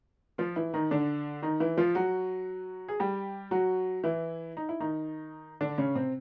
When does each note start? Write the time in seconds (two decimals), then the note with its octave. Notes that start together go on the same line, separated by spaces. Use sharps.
0.38 F3 F4
0.56 E3 E4
0.74 D#3 D#4
0.91 D3 D4
1.42 D#3 D#4
1.60 E3 E4
1.77 F3 F4
1.95 F#3 F#4
2.88 G#4
3.00 G3 G4
3.51 F#3 F#4
4.04 E3 E4
4.57 D#4
4.69 E4
4.80 D#3 D#4
5.61 D3 D4
5.78 C#3 C#4
5.95 C3 C4